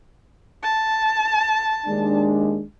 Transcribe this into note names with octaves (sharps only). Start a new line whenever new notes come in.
A5
D#2 G#3 D4